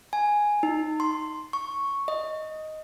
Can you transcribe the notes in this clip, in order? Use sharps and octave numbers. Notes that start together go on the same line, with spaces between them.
G#5
D#4
C6
C#6
D#5